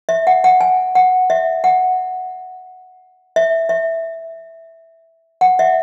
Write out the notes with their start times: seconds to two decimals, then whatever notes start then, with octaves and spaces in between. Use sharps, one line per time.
0.09 E5
0.27 F#5
0.44 F#5
0.61 G#5
0.95 F#5
1.30 E5
1.64 F#5
3.36 E5
3.69 E5
5.41 F#5
5.59 E5